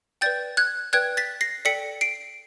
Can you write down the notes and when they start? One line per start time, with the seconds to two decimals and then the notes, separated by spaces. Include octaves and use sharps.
0.21 B4 D5 G5 G6 A6
0.57 F#6 G#6
0.93 B4 D5 G5 F#6 G#6
1.17 A6 B6
1.41 A#6 C7
1.65 A4 D5 G5 B6 C#7
2.01 C7 D7